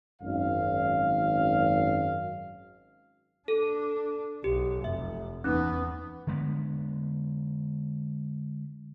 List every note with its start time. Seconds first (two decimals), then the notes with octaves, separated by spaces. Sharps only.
0.22 G#1 F#2 F5
3.48 D4 A4
4.44 B1 G4
4.84 F1 E5
5.44 E2 B3 C#4 D#4
6.27 D3 G#3 B3